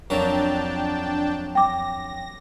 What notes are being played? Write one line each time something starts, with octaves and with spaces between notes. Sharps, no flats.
F2 F#3 D4 A#4 G5 A5
G5 D6 A#6